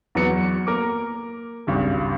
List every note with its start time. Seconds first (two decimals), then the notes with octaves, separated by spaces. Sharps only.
0.15 E2 F#3 B3 C#7
0.67 A#3 A#4 D6
1.67 G#1 C#2 G2